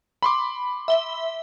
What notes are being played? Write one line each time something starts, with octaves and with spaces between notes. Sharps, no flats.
B5 C6 D6
E5 G7